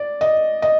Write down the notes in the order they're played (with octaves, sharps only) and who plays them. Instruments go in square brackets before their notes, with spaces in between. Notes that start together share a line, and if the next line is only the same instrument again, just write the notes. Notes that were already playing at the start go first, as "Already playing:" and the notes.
Already playing: [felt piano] D5
D#5
D#5